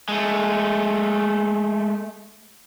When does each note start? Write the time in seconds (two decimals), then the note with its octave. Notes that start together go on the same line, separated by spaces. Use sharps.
0.09 G#3 A3